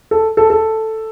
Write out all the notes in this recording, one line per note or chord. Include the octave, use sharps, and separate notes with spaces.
A4
A4
A4